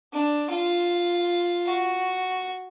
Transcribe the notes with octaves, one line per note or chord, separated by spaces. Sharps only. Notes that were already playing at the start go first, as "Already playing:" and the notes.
D4
F4
F#4